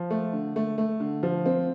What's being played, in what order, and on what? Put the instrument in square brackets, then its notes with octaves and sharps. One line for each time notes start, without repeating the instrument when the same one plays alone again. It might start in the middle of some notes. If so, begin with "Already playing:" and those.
Already playing: [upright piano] F3
A3
D3
A3
A3
D3
F3
C4